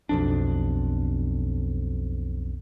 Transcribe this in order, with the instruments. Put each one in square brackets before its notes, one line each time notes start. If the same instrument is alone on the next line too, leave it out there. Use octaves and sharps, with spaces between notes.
[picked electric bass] B1 F2 D4